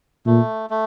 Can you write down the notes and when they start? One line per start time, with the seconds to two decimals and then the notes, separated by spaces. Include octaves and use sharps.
0.26 A#2 A3
0.70 A3